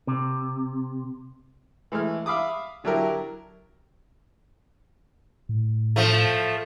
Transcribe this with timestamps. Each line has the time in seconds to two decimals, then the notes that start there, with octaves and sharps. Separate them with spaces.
0.07 C3
1.92 E3 G#3 A3 F6
2.26 E5 F5 B5 D6 D#6
2.84 D3 F#3 D4 E4 G4 A#4
5.49 A2
5.96 F3 A3